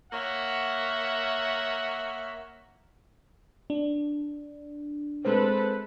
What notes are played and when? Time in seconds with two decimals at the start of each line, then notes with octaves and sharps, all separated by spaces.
0.12 A#3 C#5 E5 F#5
3.70 D4
5.25 G#3 C4 A4 B4